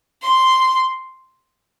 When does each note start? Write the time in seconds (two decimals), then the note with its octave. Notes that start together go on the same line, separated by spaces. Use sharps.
0.23 C6